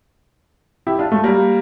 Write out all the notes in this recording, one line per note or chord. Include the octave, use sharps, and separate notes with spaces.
E4 G4
D4 F4
A3
G3 A#3